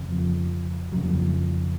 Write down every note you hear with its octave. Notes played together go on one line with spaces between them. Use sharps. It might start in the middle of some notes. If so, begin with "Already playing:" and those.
Already playing: F2 C#3
F3
F2 C#3 F#3
F3